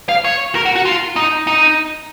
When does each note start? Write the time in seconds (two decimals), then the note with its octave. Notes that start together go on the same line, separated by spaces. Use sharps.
0.09 F5
0.24 C#5
0.55 A#4
0.65 F#4
0.76 F#4
0.85 F4
1.16 D#4
1.47 D#4